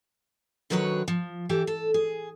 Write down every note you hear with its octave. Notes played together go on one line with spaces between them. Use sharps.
D3 D#3 F#3 F#4 B4 C#5
F3
E3 G4 A4
A4
G#4